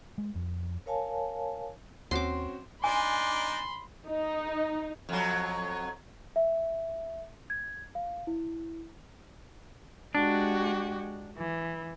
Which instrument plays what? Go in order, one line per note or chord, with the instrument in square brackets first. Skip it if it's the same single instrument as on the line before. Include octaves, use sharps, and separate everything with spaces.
[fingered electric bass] G#3
F2
[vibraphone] A#4 C#5 F5 G#5 A5
[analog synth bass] D#2 [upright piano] C4 C#4 F#4 [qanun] C6 D6
[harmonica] D4 D#4 D6 [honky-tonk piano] G#5 [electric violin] B5 C6
[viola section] D#4
[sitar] F2 F#3
[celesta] E5
G#6
F5
E4
[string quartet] G#3 F#4 G4 [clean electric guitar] D4
[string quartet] E3